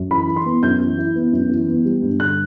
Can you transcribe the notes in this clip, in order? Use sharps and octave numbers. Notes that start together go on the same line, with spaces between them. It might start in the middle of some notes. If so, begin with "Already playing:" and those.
Already playing: F#2
E3 B5
E4
C6
B3
F#2 G6
E3
E4
B3
F#2
E3
B3
G3
G2
D3 F#6